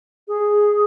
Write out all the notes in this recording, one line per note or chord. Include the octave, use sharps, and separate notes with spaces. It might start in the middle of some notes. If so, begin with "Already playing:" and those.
G#4